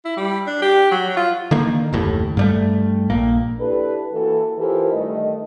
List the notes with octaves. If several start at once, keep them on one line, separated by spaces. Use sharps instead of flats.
E4
G3
D4
G4
F#3
F4
D3 D#3 A#3
F#1 D#2 A2
G2 G3 A3
A#1 A#3
D4 E4 G4 A4 B4
E3 A#3 F#4 A4
E3 F4 G4 A4 A#4 C5
G2 D#3 A3 D#5